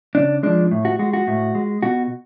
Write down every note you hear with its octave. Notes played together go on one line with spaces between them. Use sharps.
C#3 D4
F3 G#3 D4
A2
F#4
G#3 F#4
F#4
A2
G#3
B2 F#4